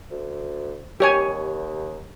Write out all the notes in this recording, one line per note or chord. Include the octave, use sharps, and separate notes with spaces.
D2
D#2 G4 C#5 G#5